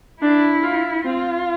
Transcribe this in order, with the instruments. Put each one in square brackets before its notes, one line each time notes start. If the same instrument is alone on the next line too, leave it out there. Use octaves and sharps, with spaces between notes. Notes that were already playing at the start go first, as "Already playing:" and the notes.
[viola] D4 [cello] E4
[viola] F4
[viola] C4 [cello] F4